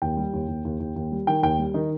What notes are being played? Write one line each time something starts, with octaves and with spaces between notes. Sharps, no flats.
D#2 G5
G3
D#2
D#2
D#2
D#2
D#2
G3
D#3 G5
D#2 G5
G3
D#3 D#4